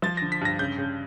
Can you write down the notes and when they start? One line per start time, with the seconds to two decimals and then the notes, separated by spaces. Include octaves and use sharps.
0.02 F3 A6
0.17 A#6
0.22 D3
0.32 B6
0.41 G2 A#6
0.59 C#3 G6
0.78 C#3